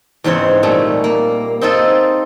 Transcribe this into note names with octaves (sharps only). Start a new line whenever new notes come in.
E2 G#2 C#3 C4 C#5
A#2 G3 A3
A#3
C4 D#4 F4 A4